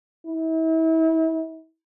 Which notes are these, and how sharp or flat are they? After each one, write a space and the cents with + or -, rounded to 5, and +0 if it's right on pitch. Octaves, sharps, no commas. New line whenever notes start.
E4 -35